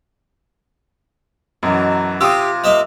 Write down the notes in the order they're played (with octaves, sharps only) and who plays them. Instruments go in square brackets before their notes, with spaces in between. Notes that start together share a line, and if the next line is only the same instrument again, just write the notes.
[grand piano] F#2 F#3 [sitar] B2 E3
[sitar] C3 F4 [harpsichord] G4 [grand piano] D#6 E6
[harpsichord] A#3 D#5 E5